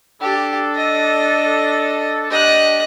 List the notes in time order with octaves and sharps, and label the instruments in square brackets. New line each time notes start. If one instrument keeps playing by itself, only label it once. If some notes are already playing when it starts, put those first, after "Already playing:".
[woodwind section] D4 A4 [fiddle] G4
[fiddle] D#5
[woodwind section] D4 G4 [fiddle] D#5 F#6